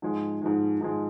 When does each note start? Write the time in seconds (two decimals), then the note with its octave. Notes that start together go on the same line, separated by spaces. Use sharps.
0.02 G#2 F3 G#3
0.42 G#2 F3 G#3
0.81 G#2 F3 G#3